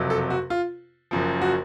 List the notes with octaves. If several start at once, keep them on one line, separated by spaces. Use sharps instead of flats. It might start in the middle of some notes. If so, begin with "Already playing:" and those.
Already playing: F#1 F2 C3 F#3
A4
F#4
F4
F#1 F#2 F3
F#4